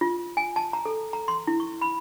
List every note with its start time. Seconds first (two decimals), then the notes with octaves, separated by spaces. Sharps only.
0.01 F4
0.37 G#5
0.56 A5
0.73 A#5
0.85 A4
1.13 A#5
1.28 C6
1.47 E4
1.60 C#6
1.81 B5